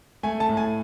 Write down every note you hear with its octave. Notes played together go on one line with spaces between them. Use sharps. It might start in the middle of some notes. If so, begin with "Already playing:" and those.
A3 G#5
A5
A2
G#5